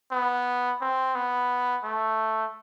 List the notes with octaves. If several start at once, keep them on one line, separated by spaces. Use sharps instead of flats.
B3
C4
B3
A3